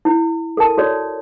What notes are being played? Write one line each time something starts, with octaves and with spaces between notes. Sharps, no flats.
E4
A4 A#4 A5
F#4 A4 C#5 D5